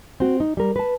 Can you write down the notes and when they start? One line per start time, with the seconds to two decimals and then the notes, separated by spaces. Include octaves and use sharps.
0.20 C4 F#4
0.40 D#4
0.57 G3 A#4
0.76 B4 A5